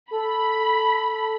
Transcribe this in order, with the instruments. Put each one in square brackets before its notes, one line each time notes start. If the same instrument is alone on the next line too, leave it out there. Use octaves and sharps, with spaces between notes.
[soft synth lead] A4 [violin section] B5